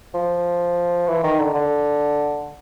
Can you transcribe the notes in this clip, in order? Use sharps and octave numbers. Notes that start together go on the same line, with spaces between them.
F3
E3
D#3
D3
D3